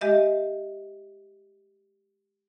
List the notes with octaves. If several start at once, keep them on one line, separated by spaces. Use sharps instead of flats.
G#3 G4 D#5 E5